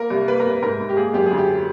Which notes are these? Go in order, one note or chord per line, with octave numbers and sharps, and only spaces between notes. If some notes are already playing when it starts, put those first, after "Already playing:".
Already playing: A#3 A#4
C2
A#3 B4
A#4
C2
B4
G#2 A#4
G#2
G4
A#3 G#4
F#2 G4
D2 G#4
G4